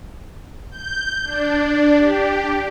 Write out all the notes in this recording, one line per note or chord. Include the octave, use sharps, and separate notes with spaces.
G6
D4
G4